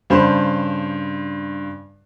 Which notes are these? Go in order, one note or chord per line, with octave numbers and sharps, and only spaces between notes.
G2 C#3 C5 B5